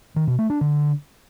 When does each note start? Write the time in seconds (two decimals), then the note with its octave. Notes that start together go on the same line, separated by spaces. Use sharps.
0.16 D#3
0.27 B2
0.39 A3
0.50 D4
0.61 D3